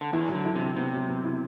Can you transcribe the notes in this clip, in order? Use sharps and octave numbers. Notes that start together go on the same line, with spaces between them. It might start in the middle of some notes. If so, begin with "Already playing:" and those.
D3
E2 E3 E4
F#3
D3
E4
C3
E4
C3 B3
F#3
B3
E4